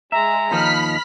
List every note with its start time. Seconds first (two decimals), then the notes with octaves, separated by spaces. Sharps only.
0.12 G#3 E5 A#5
0.51 D#2 F3 D#4 B5 F6 B6